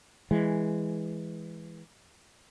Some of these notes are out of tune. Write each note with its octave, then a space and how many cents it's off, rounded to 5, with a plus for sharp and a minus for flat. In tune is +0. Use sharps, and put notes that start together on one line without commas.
E3 +0 G#3 +0